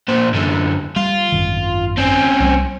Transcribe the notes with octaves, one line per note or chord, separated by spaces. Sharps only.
A#2 C5
F#2 D3
G3 F4
G#1 F#2 D#3
C4 C#4
C2 E3 G3